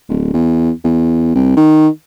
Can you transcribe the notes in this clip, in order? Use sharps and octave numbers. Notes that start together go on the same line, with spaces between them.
D1
E2
E2
C2
D#3